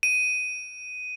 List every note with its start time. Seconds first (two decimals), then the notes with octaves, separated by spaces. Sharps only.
0.03 D#7